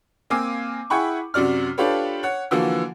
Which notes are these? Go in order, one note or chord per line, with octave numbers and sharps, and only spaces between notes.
A#3 C4 F5 G#5 D6
E4 G#4 F#5 G5 B5 C#6
F#2 C3 F#4 D5 F6
D4 F4 G4 A4 B4 C#5
C#5 F#5
D3 E3 F3 A#3 F#4